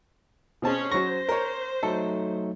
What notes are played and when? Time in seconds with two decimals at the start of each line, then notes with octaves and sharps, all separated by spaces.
0.62 B2 C4 C#4 G#4 C#5 A5
0.92 F#3 C5 C#6 A#6
1.29 A#4 C#5
1.83 F#3 A3 D#4 A4